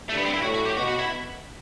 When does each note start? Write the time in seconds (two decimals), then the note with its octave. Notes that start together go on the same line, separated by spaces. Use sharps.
0.08 G2 A3
0.17 B3
0.25 C4
0.34 E4
0.42 A2 F#4
0.54 F#4
0.65 G4
0.77 B2 F#4
0.88 F#4
0.99 E4